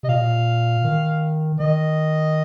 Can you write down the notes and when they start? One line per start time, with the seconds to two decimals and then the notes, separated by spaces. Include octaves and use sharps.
0.03 C3 D#5
0.09 A#2 F5
0.84 D#3
1.60 D#3 D#5